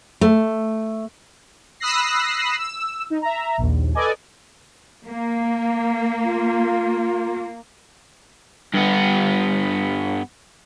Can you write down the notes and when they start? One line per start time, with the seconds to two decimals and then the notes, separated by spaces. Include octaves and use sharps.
0.21 A3
1.80 B5 D#6 E6 F#6 A#6 C7
2.59 E6
3.10 D#4
3.22 E5 A#5
3.58 A#1 D#2
3.95 A4 B4 D5 D#5 G#5
5.07 A#3
6.24 F4
8.74 G2 B3